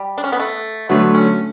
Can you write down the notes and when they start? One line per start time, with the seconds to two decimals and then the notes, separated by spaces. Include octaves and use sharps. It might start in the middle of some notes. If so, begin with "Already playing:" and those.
Already playing: G3
0.18 D4
0.24 C#4
0.32 B3
0.40 A3
0.89 D3 F#3 A3 B3
1.15 C#4